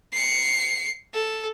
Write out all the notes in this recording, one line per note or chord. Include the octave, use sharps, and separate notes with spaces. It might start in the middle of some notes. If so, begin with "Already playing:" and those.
C7 C#7
A4